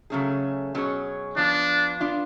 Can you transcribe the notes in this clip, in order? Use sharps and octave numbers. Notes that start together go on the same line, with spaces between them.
C#3 F#3 A3 C#4 G#4
B2 F#3 C#4 G#4 C#5
F3 B3 D4 F4
B3 D4 F4